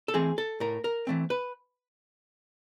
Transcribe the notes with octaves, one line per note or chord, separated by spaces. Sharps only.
A4
E3 A3 C4 G#4
A4
A2 A#4
A#4
E3 A3 C4
B4